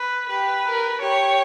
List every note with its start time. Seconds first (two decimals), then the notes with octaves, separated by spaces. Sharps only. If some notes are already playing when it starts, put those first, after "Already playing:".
Already playing: B4
0.29 G4 B4
0.65 A#4
1.01 G4 C#5